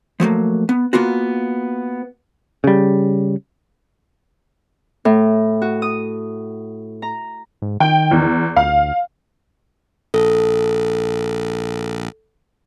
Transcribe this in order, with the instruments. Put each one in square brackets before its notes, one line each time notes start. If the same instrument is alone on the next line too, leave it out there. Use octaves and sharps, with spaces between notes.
[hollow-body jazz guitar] F3 F#3 A3 A#3
B3
A#3 B3 F4 F#4
[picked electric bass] C#3 G3
[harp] A2
F#4
D#6
A#5
[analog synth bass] G#2
[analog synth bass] D#3 [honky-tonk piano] G5
[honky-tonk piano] E2
[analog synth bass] D2 [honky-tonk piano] F5
[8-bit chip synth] A#1 [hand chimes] A4